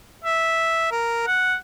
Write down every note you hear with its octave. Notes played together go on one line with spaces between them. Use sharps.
E5
A#4
F#5